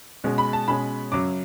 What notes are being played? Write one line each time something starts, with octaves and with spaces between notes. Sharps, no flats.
B2 G#3 C#4
B5
A5
B2 G#3 C#4 B5
F#2 C#3 F#3 D6